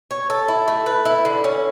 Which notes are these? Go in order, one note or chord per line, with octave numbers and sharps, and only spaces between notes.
C#5
A4
E4
A3
B4
E4
D3
C#4